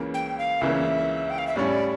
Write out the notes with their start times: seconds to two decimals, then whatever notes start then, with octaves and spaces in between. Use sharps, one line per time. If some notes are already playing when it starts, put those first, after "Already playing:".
Already playing: C#2 C#3 E3 A#3
0.14 G5
0.38 F5
0.61 C#2 C#3 E3 A#3 E5
1.30 G5
1.38 F5
1.47 E5
1.56 A2 G3 C#4 D5